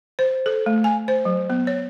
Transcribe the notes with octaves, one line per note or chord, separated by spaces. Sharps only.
C5
A4
A3
G#5
C5
F#3
B3
C#5